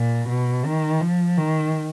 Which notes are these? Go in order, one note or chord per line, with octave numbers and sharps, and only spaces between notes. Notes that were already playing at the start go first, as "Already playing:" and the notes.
Already playing: A#2
B2
D#3
F3
D#3